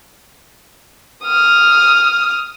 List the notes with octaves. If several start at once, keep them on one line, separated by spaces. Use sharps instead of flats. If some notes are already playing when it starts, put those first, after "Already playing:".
D#6 F6